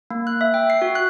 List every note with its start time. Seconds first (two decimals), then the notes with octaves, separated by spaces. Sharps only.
0.10 A#3
0.27 F#6
0.41 E5
0.54 G5
0.70 C7
0.82 F#4
0.95 F#6